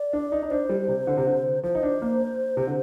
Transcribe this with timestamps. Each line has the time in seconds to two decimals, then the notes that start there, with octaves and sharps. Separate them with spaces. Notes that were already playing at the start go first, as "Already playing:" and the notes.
Already playing: D5
0.13 D4
0.32 D#4
0.42 D#4
0.50 D4 C5
0.69 G3
0.88 C3
1.07 D3
1.17 C3
1.27 D3
1.63 F3 C5
1.75 D#4
1.83 D4
2.02 A#3
2.57 C3
2.67 D3